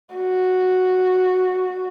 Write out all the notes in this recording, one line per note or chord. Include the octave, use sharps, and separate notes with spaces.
F#4